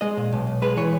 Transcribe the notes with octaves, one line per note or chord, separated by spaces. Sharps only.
G#3 D#5
A#2
B1
B1
G#3 B4
E3 C#5